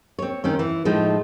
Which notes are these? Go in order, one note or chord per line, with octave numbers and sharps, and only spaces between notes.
C4 C#5
D#3 C4 C#4
E3
A2 F3 G#3 D#4